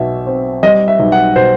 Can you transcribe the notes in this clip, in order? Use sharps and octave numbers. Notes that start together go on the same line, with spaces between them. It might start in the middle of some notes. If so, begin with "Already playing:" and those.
Already playing: B1 B2 E5
C4
G3 D#5
E5
B1
F#5
B2 C5